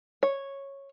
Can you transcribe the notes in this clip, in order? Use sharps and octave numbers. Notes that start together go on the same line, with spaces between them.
C#5